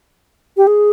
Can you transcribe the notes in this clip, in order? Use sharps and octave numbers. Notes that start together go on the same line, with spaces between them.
G4
G#4